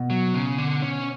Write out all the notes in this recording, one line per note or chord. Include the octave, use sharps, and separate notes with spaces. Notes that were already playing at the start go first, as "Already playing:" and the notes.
Already playing: B2
F#3
C#3
D3
C#4